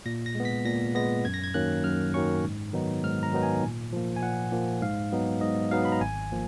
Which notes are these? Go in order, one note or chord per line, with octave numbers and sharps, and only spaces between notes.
A#2 A#6
A#6
G#3 B3
B6
A#2 A#6
G#3 B3 A#6
F#2 G#6
A#6
G#6
D#3 F#3 A#3 C#4 F#6
F#2 F6
D#3 F#3 A#3 C#4 C#6
G#2
D#3 F#3 B3 D#4
G#2 F6
A#5
D#3 F#3 B3 D#4
G#5
A#2
F3 A#3
G#5
A#2 F#5
F3 A#3
G#2 F5
F#3 B3 D#4
G#2 D#5
F#3 B3 D#4 F5
B5
A#5
G#1 G#5
F3 A#3